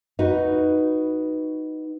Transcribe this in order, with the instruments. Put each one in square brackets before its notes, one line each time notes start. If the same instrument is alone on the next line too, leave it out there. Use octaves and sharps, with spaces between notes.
[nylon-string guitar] D#4 F#4 B4